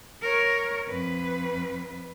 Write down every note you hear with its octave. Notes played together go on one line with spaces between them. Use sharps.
A#4 C#5
F2 B4